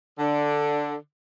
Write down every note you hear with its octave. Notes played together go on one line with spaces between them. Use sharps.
D3